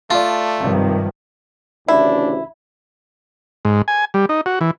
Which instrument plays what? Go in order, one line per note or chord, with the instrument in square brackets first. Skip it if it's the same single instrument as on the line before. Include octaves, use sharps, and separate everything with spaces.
[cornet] A3 [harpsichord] F4 [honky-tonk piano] D5 A5
[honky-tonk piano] G#1 C3 [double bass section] G2 D#3 F3
[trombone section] A1 D2 C#3 [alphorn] D4 [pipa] E4 [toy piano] E5
[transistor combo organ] G#2
G#5
G3
D#4
F#4
E3